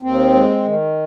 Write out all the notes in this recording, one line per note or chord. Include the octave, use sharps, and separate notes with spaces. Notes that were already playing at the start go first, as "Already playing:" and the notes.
D#2 C4
G#3
D#3